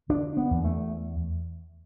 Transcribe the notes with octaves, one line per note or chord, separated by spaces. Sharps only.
D3 D4
B3
E2
A3